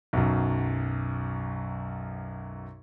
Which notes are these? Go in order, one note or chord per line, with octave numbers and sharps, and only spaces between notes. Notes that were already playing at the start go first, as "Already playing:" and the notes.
B1 F#2